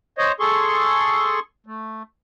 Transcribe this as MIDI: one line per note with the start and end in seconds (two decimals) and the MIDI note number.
0.18 0.32 72
0.18 0.32 73
0.18 0.32 75
0.40 1.40 68
0.40 1.40 69
0.40 1.40 84
0.40 1.40 85
1.66 2.03 57